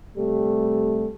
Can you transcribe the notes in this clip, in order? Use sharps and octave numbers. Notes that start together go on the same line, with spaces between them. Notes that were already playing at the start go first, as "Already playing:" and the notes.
C3 G3 A3